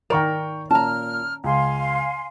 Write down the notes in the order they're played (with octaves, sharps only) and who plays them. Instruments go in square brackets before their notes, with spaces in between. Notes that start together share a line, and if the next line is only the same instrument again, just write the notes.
[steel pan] D#3 A#4 [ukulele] D5 [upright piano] G5 C#6 F7
[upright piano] A#2 [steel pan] C#4 [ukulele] A5 A#5 [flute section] F6
[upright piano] C#2 [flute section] F5 G#5 C6